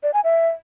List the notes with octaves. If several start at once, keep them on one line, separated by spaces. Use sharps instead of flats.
D5
G#5
E5